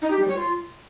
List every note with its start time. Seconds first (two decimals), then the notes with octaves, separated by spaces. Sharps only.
0.02 D#4
0.11 G4
0.19 G3
0.28 C#5
0.37 F4